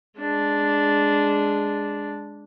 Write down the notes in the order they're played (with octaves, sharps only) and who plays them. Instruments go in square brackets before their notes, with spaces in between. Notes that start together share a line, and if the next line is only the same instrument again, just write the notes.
[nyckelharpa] G#3 D4